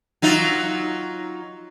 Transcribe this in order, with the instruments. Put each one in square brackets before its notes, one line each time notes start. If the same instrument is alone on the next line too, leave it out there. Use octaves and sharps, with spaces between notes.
[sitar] F#3 D#4 F4